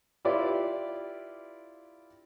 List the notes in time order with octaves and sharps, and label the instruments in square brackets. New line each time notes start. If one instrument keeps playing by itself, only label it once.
[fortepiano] E4 F4 G4 B4 D5